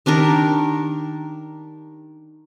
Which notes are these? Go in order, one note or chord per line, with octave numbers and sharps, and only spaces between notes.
D#3 D4 G4 A#4